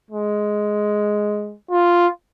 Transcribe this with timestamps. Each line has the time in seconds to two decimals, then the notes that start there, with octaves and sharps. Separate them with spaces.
0.11 G#3
1.71 F4